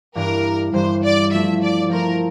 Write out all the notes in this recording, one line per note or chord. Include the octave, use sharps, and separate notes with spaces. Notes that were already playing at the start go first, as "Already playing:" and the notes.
G2 E3 G3 D4 A#4
G2 E3 G3 D4 C5
D5
F3 A3 E4 A4 C5 E5
D5
F3 A3 E4 A4 A#4 C5